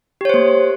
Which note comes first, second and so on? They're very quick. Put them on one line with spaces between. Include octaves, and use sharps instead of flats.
G4 C#5 C5 A#3